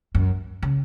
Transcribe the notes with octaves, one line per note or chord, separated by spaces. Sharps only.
F#2
C#3